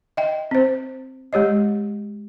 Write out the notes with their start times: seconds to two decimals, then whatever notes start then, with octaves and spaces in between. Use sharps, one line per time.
0.17 D#5 E5 G5
0.51 C4 C5
1.33 G#3 G4 C#5 D#5